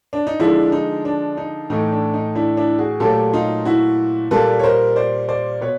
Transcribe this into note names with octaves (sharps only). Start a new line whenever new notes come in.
D4
D#4
D3 F3 G#3 D4 E4
D#4
D4
D#4
A2 E3 A3 D#4
D4
D#4
D4 E4
D4 E4
F#4 G#4
A#2 F#3 A3 G4 A4
D#4 F4
E4 F#4
A#2 G3 A#3 A4 B4
C#5
A#4 C5
C5 D5
C5 D5
B2 B4 C#5